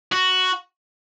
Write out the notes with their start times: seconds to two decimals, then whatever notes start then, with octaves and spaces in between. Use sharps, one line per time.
0.12 F#4